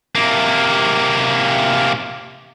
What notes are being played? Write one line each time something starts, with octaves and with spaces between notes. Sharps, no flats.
C3 A#3